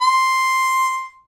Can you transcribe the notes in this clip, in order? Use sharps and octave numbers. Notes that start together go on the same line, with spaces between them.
C6